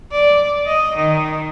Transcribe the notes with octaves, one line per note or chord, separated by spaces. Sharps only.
D5
D#5
D#3